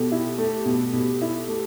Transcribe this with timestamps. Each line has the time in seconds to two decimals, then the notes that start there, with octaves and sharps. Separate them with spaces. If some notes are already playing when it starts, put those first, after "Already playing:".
Already playing: B2 G4 A4
0.12 E4
0.38 A3
0.65 B2
0.93 B2
1.22 E4
1.48 A3